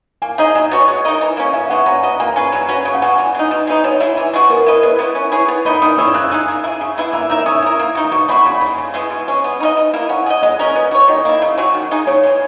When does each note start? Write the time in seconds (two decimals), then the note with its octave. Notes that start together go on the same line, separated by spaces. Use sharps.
0.22 A#3 G#5
0.38 D#4 G#4 D#5 A#5
0.55 F#3 G#5
0.71 B3 F#4 C#5
0.88 G#3
1.05 D#4 A#4 D#5
1.21 E3
1.37 A#3 C#4
1.53 B2 E5
1.70 G#3 B3 F#4 F#5
1.86 C#4 A#5
2.03 F#4 B4 D#5
2.20 A#3 G#5
2.27 A#5
2.36 C#4 G#4 B4 G#5
2.52 F#3
2.69 C#4 F#4 B4
2.85 C#3
2.94 F#5
3.02 G#3 B3 F#4 G#5
3.18 E3
3.34 G#3 D#4
3.51 B2
3.67 G#3 B3 D#4
3.84 B2 C#5
4.00 G#3 B3 E4
4.17 E3
4.33 G#3 B3 F#4
4.50 B3 A#4
4.66 E4 B4 D#5
4.83 G#3 B4
4.99 B3 E4 B4
5.15 C#4
5.32 E4 G#4 C#5
5.48 B3
5.65 D#4 A#4 D#5 B5
5.82 D#3 D#6
5.98 G#3 C#4 E4 E6
6.14 C#3 F#6
6.31 G#3 D#4 G#4
6.48 A#3
6.64 E4
6.67 G#4
6.81 C#3
6.97 G#3 B3 E4
7.13 A#3 E6
7.30 D#4 A#4 E5 E6
7.46 C#4 D#6
7.62 E4 A#4
7.79 A#3
7.95 D#4 F#4
8.05 D#6
8.12 B2 C#6
8.28 G#3 D#4 F#4 B5
8.45 C#3 B5
8.61 E3
8.66 G#3
8.78 C#3
8.94 G#3 B3 E4
9.10 B2
9.28 G#3 C#4
9.44 B3
9.60 D#4 A#4 D#5
9.76 B2
9.94 A#3 E4 A#4
10.09 C#4 F#5
10.26 G#4
10.30 D#5
10.42 G#3 D#5
10.59 C#4 F#4 A#4
10.76 B3
10.91 F#4 C#5
11.08 D#3 D#5
11.25 A#3 E4
11.42 C#3
11.58 F#3 C#4 F#4
11.74 D#3
11.91 G#3 D#4 G#4
12.07 C#3 C#5
12.23 E3 G#3